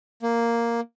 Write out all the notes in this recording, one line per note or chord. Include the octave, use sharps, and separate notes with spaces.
A#3